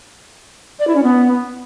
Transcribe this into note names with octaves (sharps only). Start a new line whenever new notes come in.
D5
E4
C#4
B3